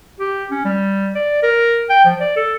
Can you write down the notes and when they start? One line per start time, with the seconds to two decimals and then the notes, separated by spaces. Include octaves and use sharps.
0.20 G4
0.51 C#4
0.65 G3
1.15 D5
1.43 A#4
1.89 G5
2.05 F3
2.20 D5
2.36 A4